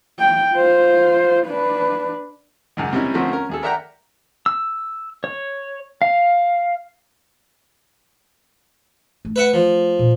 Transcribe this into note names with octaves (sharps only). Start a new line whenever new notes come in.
G5
F4 C5
D4 B4
C#2 F#2 D#3
C3 G3 A#3 C#4 D#4 E4
D3 F3 A3 A#3 C4 C#4
C#4 A#4
D#2 G#4 A4
A#4 D5 E5 F#5 G5 A#5
E6
C#5
F5
A3
B4 E5 F#5
F3
A#2